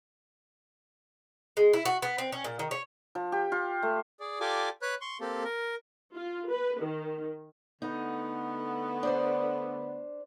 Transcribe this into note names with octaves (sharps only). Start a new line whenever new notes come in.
G#3
E4
F#4
B3
C4
C#4
A#2
D#3
C#5
F3
G4
F4
A3
G#4 D5
F4 G4 A4 D5 G#5 D6
B4 C#5 B5 F#6
C6 C#6
A#3 C4 G4 A4
A#4
F4
B4
D#3
D3 A3 B3 D#4
D4 C5 D5